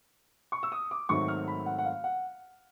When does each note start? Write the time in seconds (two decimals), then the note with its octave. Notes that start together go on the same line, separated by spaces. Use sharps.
0.52 C#6
0.63 E6
0.72 D#6
0.91 D6
1.09 G#2 D#3 F#3 A3 C4 C#6
1.28 F6
1.48 B5
1.66 F#5
1.78 F#5
1.85 F5
2.04 F#5